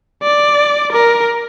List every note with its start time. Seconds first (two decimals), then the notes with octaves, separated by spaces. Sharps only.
0.22 D5
0.92 A#4